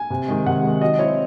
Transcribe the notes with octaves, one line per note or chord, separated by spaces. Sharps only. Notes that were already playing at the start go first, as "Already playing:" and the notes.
Already playing: G#5
C3
D#3 G#3
C3 F#5
D#3 G#3
F#3 D#5
C4 E4 C#5